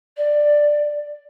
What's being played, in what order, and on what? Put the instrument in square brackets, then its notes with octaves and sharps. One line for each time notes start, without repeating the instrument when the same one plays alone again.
[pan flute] D5